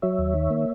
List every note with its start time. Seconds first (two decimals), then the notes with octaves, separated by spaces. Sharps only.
0.02 F#3 C#5 E5
0.18 D#2
0.35 D#3
0.50 A#3